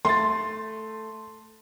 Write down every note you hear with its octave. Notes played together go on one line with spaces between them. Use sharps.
A3 C6 A6